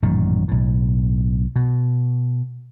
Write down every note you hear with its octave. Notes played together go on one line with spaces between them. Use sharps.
A1 F#2 A#2 D#3
B1 A2
B2